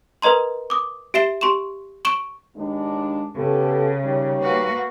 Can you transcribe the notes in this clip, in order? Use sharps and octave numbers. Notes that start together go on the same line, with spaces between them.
A#4 B4 D#5 A#5 C6
D6 D#6
G4 E5 C7 E7 G7
G4 C6 C#6 E7
C#6 D7 E7 G7
D#2 G#3 D4
C#3 B3 G4 A4
D#3 G3 C#5
A#3 F#4 B4